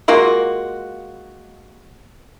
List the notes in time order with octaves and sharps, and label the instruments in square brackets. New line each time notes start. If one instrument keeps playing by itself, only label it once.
[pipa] G#3 A#3 F4 F#4